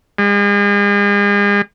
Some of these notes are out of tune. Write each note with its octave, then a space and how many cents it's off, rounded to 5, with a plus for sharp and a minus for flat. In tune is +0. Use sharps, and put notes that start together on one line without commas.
G#3 -40